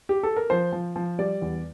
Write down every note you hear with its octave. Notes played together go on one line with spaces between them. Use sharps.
G4
A4
A#4
F3 C5
F3
F3
G3 D5
E2